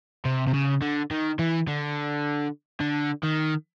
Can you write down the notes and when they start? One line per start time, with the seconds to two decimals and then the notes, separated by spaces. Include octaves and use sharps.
0.25 C3
0.47 C3
0.54 C#3
0.82 D3
1.11 D#3
1.39 E3
1.67 D3
2.80 D3
3.23 D#3